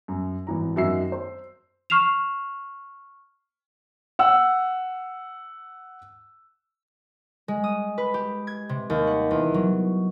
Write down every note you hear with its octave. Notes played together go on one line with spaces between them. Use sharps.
F#2
G#1 E3 A#5
F#2 D#3 F#4 E5 E6 C7
C5
C#6 F6 C7 E7 F7
F#5 E6
G#3
D#6
B4
G4
G#6
C3
D#2
F#5
E2
F#3